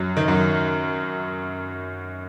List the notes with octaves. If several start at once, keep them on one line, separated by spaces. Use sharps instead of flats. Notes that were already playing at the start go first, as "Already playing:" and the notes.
Already playing: F#2 F#3
D#3
F#2 F#3